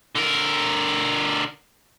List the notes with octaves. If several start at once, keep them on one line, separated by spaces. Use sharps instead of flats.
D3 A#4